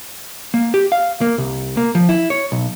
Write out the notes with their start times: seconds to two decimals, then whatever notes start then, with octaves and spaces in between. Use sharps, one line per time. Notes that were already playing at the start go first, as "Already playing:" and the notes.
0.54 A#3
0.74 G4
0.92 F5
1.21 A#3
1.38 C2
1.77 A#3
1.95 F3
2.09 E4
2.30 C#5
2.52 B1